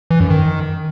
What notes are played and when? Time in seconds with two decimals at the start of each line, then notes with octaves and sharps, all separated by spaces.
0.11 E3
0.20 F#2
0.30 D#3